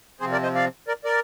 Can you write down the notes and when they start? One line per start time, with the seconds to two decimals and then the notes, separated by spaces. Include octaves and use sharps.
0.20 C3 F3 C4 G#4 C5
0.32 A#4 D5
0.43 C5 D#5
0.55 D5 F5
0.88 A#4 D5
1.04 A#4 D5